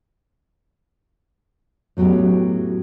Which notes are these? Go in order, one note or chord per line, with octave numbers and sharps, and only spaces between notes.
A2 F#3 B3 C#4 G4